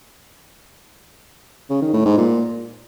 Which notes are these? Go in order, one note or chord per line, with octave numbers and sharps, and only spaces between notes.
C#3
D#3
A2
G#2
A#2